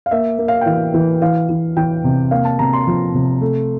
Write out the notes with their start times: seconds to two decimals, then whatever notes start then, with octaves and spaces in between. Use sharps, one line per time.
0.06 F5
0.11 A#3 E5
0.39 A#3
0.48 F5
0.61 G5
0.66 E3 F5
0.94 E3
1.21 E3 F5
1.49 E3
1.77 E3 G5
2.04 C3
2.31 A#3 F5
2.45 A5
2.59 C3 A#5
2.73 C6
2.87 F3
3.14 C3
3.41 A3